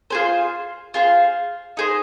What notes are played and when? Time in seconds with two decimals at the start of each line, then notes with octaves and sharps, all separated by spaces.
0.10 F4 G#4 C5
0.94 F4 G#4 C5
1.77 D#4 G#4 C5